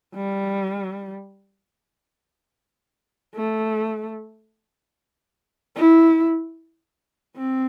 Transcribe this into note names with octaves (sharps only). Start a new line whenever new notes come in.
G3
A3
E4
C4